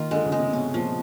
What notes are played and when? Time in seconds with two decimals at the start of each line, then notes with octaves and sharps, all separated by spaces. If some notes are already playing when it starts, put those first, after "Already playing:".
Already playing: D#3 A#3 F4
0.11 D3 G#3
0.26 C#3
0.32 G#3
0.39 C3
0.52 B2 C#4
0.73 A#2 F3